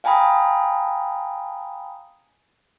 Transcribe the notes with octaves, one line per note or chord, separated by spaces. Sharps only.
F5 G5 G#5 A#5 B5 D#6